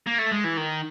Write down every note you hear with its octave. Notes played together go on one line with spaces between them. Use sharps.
A#3
A3
G#3
E3
D#3